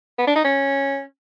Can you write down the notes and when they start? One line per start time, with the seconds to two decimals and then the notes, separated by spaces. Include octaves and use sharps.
0.18 B3
0.27 D4
0.36 D#4
0.44 C#4